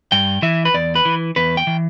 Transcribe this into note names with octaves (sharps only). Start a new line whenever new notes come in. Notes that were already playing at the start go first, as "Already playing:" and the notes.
G2 G5
E3 E5
B4
E2 D5
B4
E3
E2 B4
G5
E3